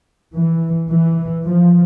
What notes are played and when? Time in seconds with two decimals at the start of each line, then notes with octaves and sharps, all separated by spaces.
0.35 E3
0.90 E3
1.45 F3